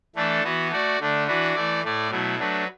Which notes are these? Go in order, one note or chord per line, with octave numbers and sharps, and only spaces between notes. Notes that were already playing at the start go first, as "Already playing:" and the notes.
E3 A3 D4 A4
E3 B3 F#4
A3 F#4 D5
D3 A3 D4
E3 D4 F#4 B4
E3 A3 E4 D5
A2 A3 E4 D5
B2 F#3 A3 E4
F#3 A3 D4 B4